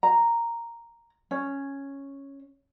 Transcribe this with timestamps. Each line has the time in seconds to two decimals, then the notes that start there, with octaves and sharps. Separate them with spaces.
0.03 A#5
1.31 C#4